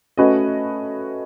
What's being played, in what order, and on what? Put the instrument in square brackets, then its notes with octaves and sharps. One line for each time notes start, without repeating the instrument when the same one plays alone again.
[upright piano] A3 C#4 F#4 B4 D#5